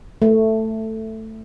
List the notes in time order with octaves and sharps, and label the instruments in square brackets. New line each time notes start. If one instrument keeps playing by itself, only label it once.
[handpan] A3